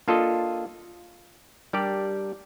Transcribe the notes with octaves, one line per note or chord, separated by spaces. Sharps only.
A#3 D4 F4 A4 D#5
G3 D4 G4 A#4 D5